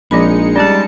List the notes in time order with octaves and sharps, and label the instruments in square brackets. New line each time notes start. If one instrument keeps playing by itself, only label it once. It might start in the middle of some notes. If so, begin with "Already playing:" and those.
[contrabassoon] A#1 [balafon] F3 C4 B5 [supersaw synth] G#3 D#4 C#7
[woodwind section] G3 A5 [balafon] C#4 G#4